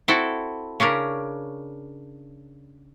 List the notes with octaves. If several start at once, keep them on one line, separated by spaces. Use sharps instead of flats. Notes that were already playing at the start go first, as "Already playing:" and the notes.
C4 E4 F#4 A4
C#3 C#4 D4 A#4